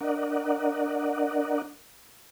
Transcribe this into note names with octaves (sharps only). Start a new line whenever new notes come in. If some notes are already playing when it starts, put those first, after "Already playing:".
D4 A#4 D5 D#5 F#5